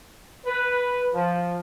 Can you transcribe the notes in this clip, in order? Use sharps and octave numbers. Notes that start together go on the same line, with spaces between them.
B4
F3